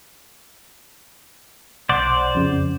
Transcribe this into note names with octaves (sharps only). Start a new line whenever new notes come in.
B1 C5 D5 F#5
F2 C#3